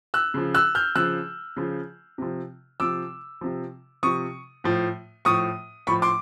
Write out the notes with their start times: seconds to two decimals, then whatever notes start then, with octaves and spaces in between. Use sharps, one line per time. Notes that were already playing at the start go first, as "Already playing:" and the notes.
0.14 E6 F#6
0.34 C#3 F3
0.54 E6 F#6
0.75 F6 G6
0.95 C#3 F3 E6 F#6
1.57 C#3 F3
2.18 C3 F3
2.80 C3 F3 D6 E6
3.41 C3 F3
4.03 C3 F3 C#6 D#6
4.64 A2 F3
5.25 A2 F3 C#6 D#6
5.87 A2 F3 B5 C#6
6.02 C6 D6